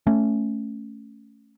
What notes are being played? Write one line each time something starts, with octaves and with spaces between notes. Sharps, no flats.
A3 C#4